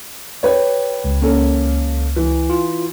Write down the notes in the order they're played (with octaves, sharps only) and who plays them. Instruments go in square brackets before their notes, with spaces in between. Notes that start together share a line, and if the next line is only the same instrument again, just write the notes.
[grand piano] G4 B4 C#5
[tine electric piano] C#2
[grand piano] A#3 C#4 A4
E3
[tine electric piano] F4